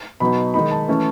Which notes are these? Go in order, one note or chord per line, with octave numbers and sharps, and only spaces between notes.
B2 F#3 B3 D#4 B5
D#3 G#3 D#4 B5
A5
E3 A3 C#4